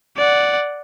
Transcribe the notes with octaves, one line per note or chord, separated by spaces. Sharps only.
D5 F#5